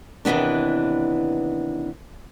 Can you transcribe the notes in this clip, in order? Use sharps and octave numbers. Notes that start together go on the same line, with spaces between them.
D#2 C3 E3 B3 D4